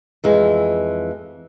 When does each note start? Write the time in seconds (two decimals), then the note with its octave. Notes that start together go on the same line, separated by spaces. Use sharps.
0.24 F2 E3 G#3